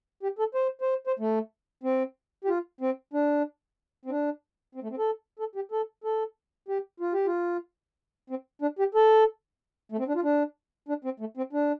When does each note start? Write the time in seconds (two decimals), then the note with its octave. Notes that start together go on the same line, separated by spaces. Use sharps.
0.23 G4
0.39 A4
0.55 C5
0.81 C5
1.07 C5
1.19 A3
1.84 C4
2.45 G4
2.49 F4
2.81 C4
3.13 D4
4.05 C4
4.10 D4
4.75 C4
4.83 A3
4.90 C4
4.98 A4
5.39 A4
5.55 G4
5.72 A4
6.04 A4
6.68 G4
7.00 F4
7.13 G4
7.26 F4
8.30 C4
8.62 D4
8.79 G4
8.95 A4
9.92 A3
9.99 C4
10.08 D4
10.16 F4
10.24 D4
10.89 D4
11.05 C4
11.20 A3
11.37 C4
11.53 D4